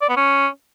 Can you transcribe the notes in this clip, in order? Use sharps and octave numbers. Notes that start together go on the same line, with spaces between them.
D5
B3
C#4